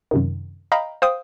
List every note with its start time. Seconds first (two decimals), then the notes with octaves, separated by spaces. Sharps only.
0.11 F#2 C3 D#3
0.72 D#5 F5 G5 A#5 B5
1.02 C5 F5 G5 D#6